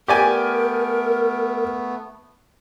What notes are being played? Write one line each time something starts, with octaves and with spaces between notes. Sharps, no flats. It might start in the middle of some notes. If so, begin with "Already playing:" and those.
A3 B3 G4 A#4 D5 G#5